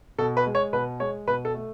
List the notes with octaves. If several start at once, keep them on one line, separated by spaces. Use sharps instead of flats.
B2 A4
B4
G#3
C#5
B2 B4
G#3 C#5
B2 B4
A4
A3